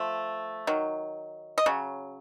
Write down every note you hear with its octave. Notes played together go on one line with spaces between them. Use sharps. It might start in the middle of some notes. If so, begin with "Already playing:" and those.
Already playing: F3 A3
D#3 F#3
D#5
C#3 F#3